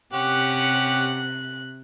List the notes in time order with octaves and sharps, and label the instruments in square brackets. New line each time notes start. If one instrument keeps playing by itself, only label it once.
[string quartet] C3 F#6 [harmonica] C#4 G4 F#5